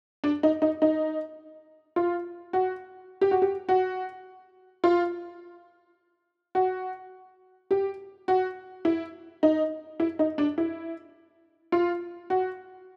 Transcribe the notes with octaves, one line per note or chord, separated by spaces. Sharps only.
D4
D#4
D#4
D#4
F4
F#4
G4
F#4
G4
F#4
F4
F#4
G4
F#4
E4
D#4
E4
D#4
D4
E4
F4
F#4